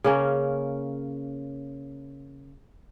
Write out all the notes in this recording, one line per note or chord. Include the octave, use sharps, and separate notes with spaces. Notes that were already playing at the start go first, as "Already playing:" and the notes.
C#3 A#3 C#4